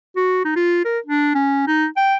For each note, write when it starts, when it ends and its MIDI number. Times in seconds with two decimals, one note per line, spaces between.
0.16 0.42 66
0.45 0.54 63
0.56 0.80 65
0.85 0.99 70
1.06 1.33 62
1.35 1.64 61
1.67 1.86 63
1.97 2.16 79